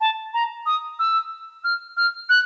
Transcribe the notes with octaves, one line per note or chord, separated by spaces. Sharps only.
A5
A#5
D#6
E6
F6
F6
F#6